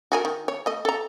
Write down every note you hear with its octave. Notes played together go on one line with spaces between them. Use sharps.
F#4 G#4 A#4
D#3
C#5
A3 D#5
A4 A#5